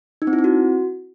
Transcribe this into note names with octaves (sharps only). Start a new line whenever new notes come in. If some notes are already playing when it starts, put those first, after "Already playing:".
D#4
C4
E4
C4
F#4